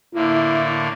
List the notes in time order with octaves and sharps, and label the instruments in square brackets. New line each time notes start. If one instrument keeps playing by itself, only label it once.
[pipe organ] A2 D3 A#3 [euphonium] E4